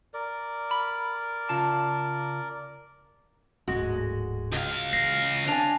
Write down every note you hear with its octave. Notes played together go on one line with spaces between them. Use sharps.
A#4 D5
B5
C#3 F4 A5
D1 G#2 G#3 F#4
C#2 F5
E3 A#6 C7
D4 G#5 F7